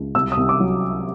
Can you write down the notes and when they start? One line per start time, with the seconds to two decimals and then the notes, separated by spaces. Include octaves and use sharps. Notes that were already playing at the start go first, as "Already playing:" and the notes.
Already playing: C#2
0.15 C2 E6
0.32 D#6
0.37 C2
0.49 D6
0.60 F#3